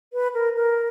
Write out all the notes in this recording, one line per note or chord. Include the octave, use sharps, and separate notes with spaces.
B4
A#4
A#4